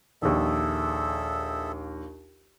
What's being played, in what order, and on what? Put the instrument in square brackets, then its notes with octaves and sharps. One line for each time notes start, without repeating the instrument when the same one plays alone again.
[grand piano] A#1 D#2 [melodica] G#4 A4 E5